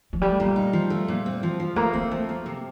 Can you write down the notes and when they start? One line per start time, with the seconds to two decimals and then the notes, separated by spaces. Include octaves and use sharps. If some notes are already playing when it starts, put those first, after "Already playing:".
0.13 F3
0.22 G3 A3
0.40 A#2
0.56 D#4
0.73 F3
0.90 A3
1.08 A#2
1.26 C4
1.43 F3
1.60 F3
1.76 A3 A#3
1.93 A#3 C4
2.11 F3 A3
2.29 A#3
2.46 C3